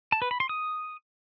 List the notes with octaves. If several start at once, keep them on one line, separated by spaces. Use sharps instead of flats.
A5
B4
B5
C6
D#6